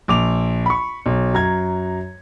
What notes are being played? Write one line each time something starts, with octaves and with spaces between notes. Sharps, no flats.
A#1 D6 F7
B5 C#6
B1
F#2 A#5 G#6